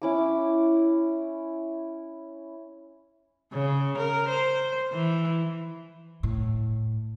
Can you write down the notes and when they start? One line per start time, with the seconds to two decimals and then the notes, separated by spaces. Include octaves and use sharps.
0.02 C#4 E4 D6
3.53 C#3
3.98 A#4
4.29 C5
4.93 E3
6.23 A2